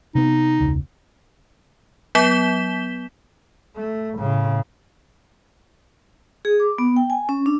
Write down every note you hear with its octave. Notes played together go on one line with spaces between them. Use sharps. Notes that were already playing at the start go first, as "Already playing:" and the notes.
C3 B3 D#4
E1 C#2
F#3 B3 G6 B6 E7 G7
A3
A2 C#3
G#4
D6
B3
G5
G#5
C#4
D4